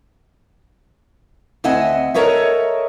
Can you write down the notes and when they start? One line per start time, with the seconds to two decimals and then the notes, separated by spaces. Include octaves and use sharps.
1.64 D2 C4 D#5 E5 F#5 G#5
2.14 A4 A#4 C#5 D#5 E5